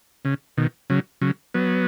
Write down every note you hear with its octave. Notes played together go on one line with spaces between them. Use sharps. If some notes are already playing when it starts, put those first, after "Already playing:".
C#3
B2 D#3
C#3 F#3
C#3 F#3
F#3 B3